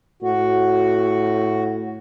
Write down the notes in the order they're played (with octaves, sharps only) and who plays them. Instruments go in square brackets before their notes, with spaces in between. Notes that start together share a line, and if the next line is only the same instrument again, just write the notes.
[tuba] A2 [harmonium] F#4